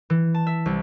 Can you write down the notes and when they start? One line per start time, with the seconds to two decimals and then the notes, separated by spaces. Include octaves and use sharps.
0.10 E3
0.34 A5
0.47 E5
0.66 C2